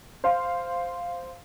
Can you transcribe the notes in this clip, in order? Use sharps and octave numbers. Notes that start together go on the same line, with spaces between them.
C5 F5